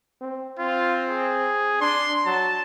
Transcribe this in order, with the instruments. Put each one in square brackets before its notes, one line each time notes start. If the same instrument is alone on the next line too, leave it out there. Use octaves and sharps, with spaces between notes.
[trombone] C4
[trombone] C4 [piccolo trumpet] F4
[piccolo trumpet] G#4
[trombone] D4 [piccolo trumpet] C6
[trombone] F#3 [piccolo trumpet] A5